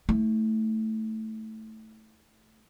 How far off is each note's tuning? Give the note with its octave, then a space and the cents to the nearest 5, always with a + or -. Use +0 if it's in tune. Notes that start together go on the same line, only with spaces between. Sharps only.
A3 +0 E4 -35